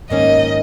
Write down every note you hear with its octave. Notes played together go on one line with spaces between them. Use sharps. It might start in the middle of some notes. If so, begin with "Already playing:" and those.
G#2 D#3 A#3 C#4 D#5